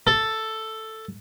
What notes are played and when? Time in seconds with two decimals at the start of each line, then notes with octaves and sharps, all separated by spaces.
0.07 A4